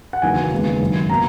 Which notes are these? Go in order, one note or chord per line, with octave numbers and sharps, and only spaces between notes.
F#5
F#1 E2 D#3 F#3 A#3 G#5
D#2 C#3 G#3 B3
G#1 F#2 D#3
B2 A#3 A#5